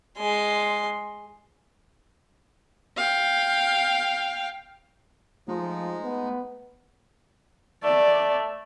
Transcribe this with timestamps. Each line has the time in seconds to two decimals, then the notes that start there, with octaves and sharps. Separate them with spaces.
0.18 G#3 C6
2.97 F5 G5
5.48 F3 G#3 A3 D#4
6.04 B3
7.83 A3 D5